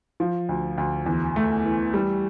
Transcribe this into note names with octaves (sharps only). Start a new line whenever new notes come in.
F3
D2
D2
E2
A3
E3
G3